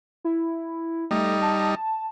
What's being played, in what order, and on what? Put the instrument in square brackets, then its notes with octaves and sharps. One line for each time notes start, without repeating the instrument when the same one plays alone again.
[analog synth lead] E4
[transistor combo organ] G3 D#4 [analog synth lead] A3
[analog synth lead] A5